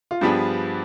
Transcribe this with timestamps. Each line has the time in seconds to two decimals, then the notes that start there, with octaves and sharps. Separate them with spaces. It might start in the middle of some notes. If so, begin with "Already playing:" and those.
0.11 F4
0.21 G2 F3 B3 D4 G4 G#4